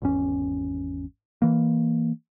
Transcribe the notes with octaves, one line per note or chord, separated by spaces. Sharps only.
G#1 E2 C#4
E3 A#3